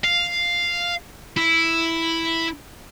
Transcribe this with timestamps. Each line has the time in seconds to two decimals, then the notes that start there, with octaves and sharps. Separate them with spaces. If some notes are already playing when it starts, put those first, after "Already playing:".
0.04 F5
1.37 E4